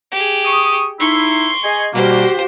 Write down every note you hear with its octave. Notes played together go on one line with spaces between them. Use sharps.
G4 G#4
C#6 D#6
D#4 E4 C6 C#6
G#4 D#5 G#5
B2 G3 A#3 F#4 G4 C5